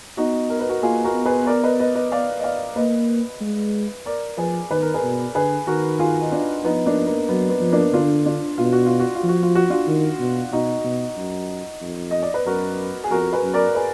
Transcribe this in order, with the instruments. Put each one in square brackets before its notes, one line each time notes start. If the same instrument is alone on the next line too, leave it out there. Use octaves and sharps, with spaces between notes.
[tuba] B3 [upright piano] D#4 F#4
[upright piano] A#4
B4
F#4 A#4
[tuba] A#3 [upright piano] F4 G#4
[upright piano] F#4 A#4
[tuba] B3
[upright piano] G#4 B4
A#4 D5
B4 D#5
B4 D#5
B4 D#5
D5 F5
D#5
D5 F5
[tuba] A#3 [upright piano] B4 D#5
[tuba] G#3
[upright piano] A#4 D5
[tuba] F3 [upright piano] G#4 B4
[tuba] D#3 [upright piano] B4
[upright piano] A#4
G#4 B4
[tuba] B2
[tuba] D3 [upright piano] G#4 B4
[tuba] D#3 [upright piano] F#4 A#4
[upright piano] F4 G#4
D#4
D4 F4
[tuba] F3 [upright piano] B3 D#4
[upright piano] A#3 D4
A#3
[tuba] F#3 [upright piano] B3
[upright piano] B3
[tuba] F3
[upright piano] A#3 D4
[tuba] D3 [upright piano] D4 F4
[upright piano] D4 F4
[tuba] B2 [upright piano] F4
[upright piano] F#4
F4
F#4
F4
[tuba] F3 [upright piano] F#4
[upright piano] F4
F#4
D4 F4
[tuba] D#3
B2
[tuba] B2 [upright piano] D#4 F#4
[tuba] B2
F#2
F2
[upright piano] D#5
D5
B4
[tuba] F#2 [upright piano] F#4 A#4
[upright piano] G#4
[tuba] F2 [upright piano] F#4 A#4
[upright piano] G#4 B4
[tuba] F#2
[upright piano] A#4 D5
G#4 B4